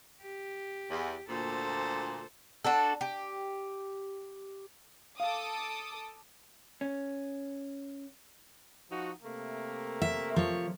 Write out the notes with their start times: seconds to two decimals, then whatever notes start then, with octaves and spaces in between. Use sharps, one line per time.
0.21 G4
0.90 E2
1.29 D2 A#2 A4 C5
2.64 D4 F#4 A4
3.01 G4
5.20 A4 F5 D6 D#6
6.81 C#4
8.90 F3 D#4 F#4
9.23 C3 A3 A#3
10.02 E5
10.36 F3 C#5